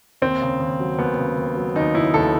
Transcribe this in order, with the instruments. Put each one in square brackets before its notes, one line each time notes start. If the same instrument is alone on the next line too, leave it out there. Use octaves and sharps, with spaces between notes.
[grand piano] D#2 C4
C#3
D#2
F#3
D#2 B3
C#3
D#2
F#3
D#2 D#4
C#3 E4
D#2 A4